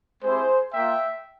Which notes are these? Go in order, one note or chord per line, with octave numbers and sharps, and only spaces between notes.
G#3 C4 E4 G4 G#4 C5
A#3 F4 E5 G5